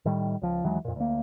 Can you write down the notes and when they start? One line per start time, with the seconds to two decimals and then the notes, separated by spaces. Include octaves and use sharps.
0.05 A2 D#3 G3
0.42 C#2 F3
0.64 D#2 E3 F#3 G#3
0.85 F2 A#2
0.96 D2 A#3